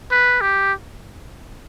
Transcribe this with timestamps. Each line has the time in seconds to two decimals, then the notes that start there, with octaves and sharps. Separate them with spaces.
0.11 B4
0.41 G4